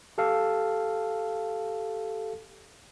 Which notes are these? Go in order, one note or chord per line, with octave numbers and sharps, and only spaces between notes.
G4 A4 F5